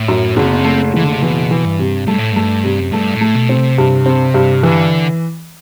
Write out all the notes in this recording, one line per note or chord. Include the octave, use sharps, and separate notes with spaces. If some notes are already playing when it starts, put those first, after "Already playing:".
Already playing: A2
F#2
F#1 D3
C3
B2
C3
A3
F#1 E3
D3
C3
B2 E3
E3
G2
C3
G2 A3
A2
G2 A3
C3
F#2
G2 A3
A2
A3
B2
C4
C3
G2
C4
G2
D3 E3